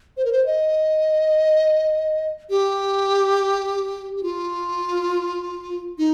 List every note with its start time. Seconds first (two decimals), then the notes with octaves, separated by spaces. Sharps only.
0.17 C5
0.25 A#4
0.32 C5
0.46 D#5
2.50 G4
4.17 G4
4.23 F4
5.98 D#4